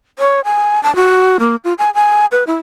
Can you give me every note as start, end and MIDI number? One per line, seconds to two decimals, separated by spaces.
0.19 0.40 73
0.45 0.82 80
0.83 0.94 81
0.96 1.37 66
1.40 1.56 58
1.64 1.73 65
1.78 1.90 80
1.95 2.26 80
2.32 2.44 71
2.47 2.56 64